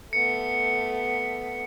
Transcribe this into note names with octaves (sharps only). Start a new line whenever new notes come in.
A3 B3 C#7